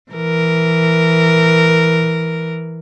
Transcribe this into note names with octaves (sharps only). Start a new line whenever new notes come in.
E3 A#4